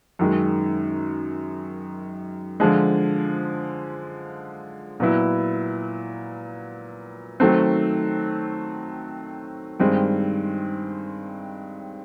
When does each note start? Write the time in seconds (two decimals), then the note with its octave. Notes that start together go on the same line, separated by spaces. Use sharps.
0.19 F#2 D#3 G#3
2.60 D3 F3 G#3
5.00 A#2 F#3 B3 E4
7.40 D#3 F#3 A3 C4
9.80 G2 D#3 G#3 C4